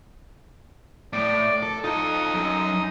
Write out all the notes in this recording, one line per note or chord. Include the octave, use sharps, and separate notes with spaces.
A2 D5
A4
D#4 F4 A4
F#2